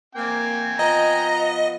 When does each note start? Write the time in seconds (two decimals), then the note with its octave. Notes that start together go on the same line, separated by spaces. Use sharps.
0.15 A#3 C4 G5 G#5
0.79 F3 B3 D#5 A#5